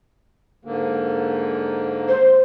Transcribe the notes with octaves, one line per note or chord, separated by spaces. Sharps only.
G#2 D3 A#3
C5